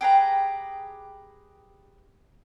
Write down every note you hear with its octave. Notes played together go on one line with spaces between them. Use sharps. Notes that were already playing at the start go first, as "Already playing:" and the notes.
G4 G#4 B4 A#5